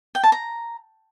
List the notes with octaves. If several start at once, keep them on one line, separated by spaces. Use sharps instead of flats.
G5
A5
A#5